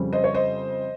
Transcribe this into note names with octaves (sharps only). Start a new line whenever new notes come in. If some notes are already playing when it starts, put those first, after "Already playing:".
Already playing: F2 C#3 G3 C4
C5 D#5
C#5
C5 D#5